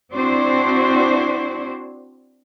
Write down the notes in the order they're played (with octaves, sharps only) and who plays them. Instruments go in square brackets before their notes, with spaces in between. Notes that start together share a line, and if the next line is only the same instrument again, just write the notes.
[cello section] C4 D4 E4 F#4 C5